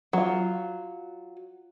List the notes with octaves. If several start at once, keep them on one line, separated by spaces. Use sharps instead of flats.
F#3 F4